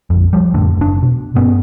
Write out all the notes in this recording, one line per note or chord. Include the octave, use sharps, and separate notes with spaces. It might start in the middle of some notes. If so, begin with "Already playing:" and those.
A#1 F2
F3 G3
F2 A2 D3
F#1 D4
B2
G2 B3 C#4